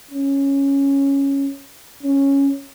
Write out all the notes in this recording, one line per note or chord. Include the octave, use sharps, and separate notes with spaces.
C#4
C#4